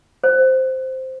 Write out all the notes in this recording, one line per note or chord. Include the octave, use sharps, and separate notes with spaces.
C5